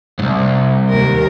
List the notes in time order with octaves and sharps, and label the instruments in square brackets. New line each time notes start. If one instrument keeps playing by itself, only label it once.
[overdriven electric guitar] C2 G#2
[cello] D#2 A#4